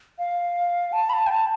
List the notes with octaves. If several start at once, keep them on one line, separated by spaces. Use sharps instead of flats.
F5
A5
B5
A5
G5
A5